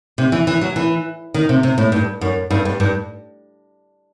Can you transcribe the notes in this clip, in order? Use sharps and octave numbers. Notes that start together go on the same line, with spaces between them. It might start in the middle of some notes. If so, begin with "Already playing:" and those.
C3
E3
E3
F#3
E3
D#3
C3
C3
A2
G2
F#2
G2
G2
G2